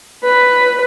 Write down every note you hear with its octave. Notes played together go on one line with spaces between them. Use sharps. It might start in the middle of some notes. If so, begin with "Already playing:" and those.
B4